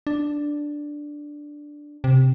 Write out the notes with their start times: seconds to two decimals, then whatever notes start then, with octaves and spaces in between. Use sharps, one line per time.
0.07 D4
2.04 C3